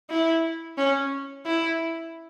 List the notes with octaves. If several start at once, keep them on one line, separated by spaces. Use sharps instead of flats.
E4
C#4
E4